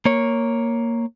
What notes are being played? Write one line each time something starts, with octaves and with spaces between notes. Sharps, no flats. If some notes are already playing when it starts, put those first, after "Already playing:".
A#3 C#5